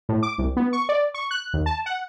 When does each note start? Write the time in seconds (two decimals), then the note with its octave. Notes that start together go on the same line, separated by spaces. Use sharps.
0.09 A2
0.23 D6
0.38 C2
0.57 B3
0.73 C#6
0.89 D5
1.14 C#6
1.31 F#6
1.53 D#2
1.66 A5
1.86 F#5